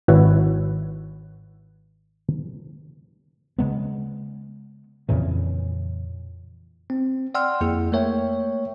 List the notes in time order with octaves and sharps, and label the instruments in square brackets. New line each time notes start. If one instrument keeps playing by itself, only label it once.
[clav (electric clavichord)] G#1 E4 F#4 B4 C#5
[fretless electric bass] C#3 G#3 B3
F2 A#2 C#3 E3
[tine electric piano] C4
D5 F#5 G5 C6 E6 F6
F2 A#3 E4 G#4
A3 A#3 A#4 C#5 E5 G5